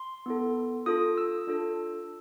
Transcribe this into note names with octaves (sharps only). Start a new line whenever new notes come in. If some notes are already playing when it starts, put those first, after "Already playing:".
Already playing: C6
B3 E4 A4
D4 F4 A4 D#6
E6
D4 F4 A4